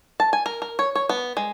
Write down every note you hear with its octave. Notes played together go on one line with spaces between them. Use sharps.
A5
G#5
A#4
A#4
C#5
C#5
B3
G#3